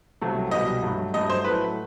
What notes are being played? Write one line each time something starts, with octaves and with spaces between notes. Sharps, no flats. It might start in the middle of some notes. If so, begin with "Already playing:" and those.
C2 C3 F#3 A3
C2 B2 G3 D#5
G2 F#3 A3
G2 F#3 A3 D#5
C5
A2 F#3 A3 B4